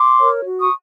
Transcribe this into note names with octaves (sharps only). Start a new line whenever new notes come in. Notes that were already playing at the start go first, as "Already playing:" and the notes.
Already playing: C6 D6
A#4 C#5
F#4
C#6 D#6